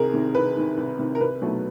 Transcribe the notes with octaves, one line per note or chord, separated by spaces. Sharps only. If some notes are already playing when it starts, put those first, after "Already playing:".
Already playing: C2 C3 D#3 G#4 A#4
C3 D#3
C2 B4
C3 D#3
C2
C3 D#3
A#4
C2 B4
B2 F#3 A3